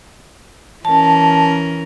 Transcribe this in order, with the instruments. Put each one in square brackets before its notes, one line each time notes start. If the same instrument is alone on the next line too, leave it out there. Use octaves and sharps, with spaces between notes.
[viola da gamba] E3 C#4 A#4 [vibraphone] A5